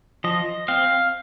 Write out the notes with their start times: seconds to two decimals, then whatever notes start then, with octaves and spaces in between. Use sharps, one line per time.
0.24 F3 D#5
0.68 C4 F5